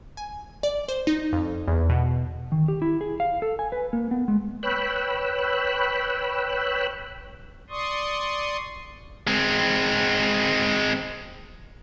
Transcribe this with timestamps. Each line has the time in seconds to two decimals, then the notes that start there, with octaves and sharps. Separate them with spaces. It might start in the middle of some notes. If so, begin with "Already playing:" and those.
0.17 G#5
0.63 D5
0.88 C5
1.07 D#4
1.32 F2
1.67 E2
1.90 B2
2.52 D#3
2.68 G4
2.82 E4
3.01 G#4
3.20 F5
3.42 A4
3.59 G#5
3.72 B4
3.93 A#3
4.11 B3
4.28 G#3
4.63 B4 C#5 G5 B5 E6 F#6
7.70 D5 C6 C#6 D#6
9.27 G#3 C4